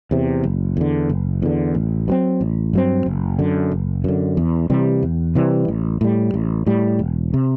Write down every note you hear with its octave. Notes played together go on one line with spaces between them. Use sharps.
E2 C3
F#1
E2 D3
F#1
E2 D3
A1
G2 F#3 C4
A1
G2 F#3 C4
F#1
F#2 D3
F#1
F#2 D3
E2
C3 E3 G3
E2
C3 E3 G3
A1
A2 G3
A1
A2 G3
E1
C3